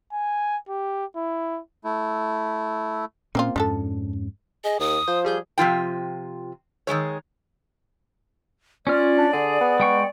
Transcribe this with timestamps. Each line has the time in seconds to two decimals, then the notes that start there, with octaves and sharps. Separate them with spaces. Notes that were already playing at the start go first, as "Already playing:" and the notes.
0.12 G#5
0.69 G4
1.16 E4
1.84 A3 E4
3.35 A#2 A#3 C4 C#4 F4
3.56 F2 G#2 F3 C#4 D4 A4
4.64 G#4 D#5
4.80 D#2 D#6
5.08 F3 C5
5.24 G3 G#4 G6
5.58 C3 F3 F4 G5
6.87 D#3 E3 G#3 C#5
8.87 C#4 F4 D5 F6
9.18 D4
9.33 D3 G#4
9.61 B3
9.80 G#3 G5 C#6